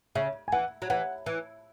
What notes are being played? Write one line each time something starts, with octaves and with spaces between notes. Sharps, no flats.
C#3 E5
G#5
E3 F#5
F#3
E3 F#5
E3